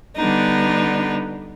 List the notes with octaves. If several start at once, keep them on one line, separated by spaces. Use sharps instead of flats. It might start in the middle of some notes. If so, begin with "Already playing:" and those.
D3 G3 B3 D4 D#4